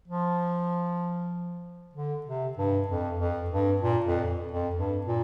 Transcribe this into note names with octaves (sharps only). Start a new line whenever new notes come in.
F3
D3
C3
G2
F2
F2
G2
A#2
F2
F2
G2
A#2